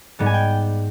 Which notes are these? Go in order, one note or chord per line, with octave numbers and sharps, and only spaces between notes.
G#2 G3 B3
G#5
G5